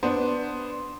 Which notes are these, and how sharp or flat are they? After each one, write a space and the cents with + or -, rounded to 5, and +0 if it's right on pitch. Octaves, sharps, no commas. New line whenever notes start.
B3 +5 D4 +0 C5 +0